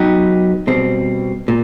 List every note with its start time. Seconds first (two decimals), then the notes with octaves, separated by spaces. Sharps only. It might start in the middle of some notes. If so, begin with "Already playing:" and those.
Already playing: F#3 B3 D#4 G4
0.67 B2 G3 C4
1.48 A#2